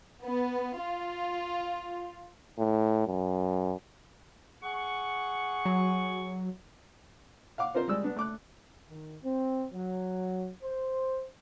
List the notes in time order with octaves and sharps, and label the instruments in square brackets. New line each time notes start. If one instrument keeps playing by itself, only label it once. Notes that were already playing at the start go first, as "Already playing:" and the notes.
[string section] B3
F4
[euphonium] A2
F#2
[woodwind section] G#4 F#5 C#6
[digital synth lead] F#3
[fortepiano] F5 F#5 D6
C4 F4 A#4 C5
G3 G#3 D5 E6
B3 D4
A3 D6 F#6
[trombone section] D#3
C4
F#3
C5